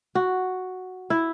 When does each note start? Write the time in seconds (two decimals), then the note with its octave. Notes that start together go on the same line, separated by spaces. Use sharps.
0.15 F#4
1.10 E4